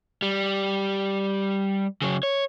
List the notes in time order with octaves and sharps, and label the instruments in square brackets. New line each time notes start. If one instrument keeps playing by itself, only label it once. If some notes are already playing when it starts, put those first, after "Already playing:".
[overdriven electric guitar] G3
C#3 F#3
C#5